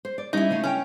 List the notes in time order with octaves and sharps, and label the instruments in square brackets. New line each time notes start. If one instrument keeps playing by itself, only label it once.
[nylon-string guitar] C5
D5
[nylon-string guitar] G3 C#4 [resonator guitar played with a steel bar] D#4 E4
[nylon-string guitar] C#3 A3 C#4
[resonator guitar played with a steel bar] C#4 [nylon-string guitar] A#4 E5 G5